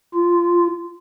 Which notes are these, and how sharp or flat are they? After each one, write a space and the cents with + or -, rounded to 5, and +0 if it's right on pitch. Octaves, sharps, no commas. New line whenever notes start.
F4 -10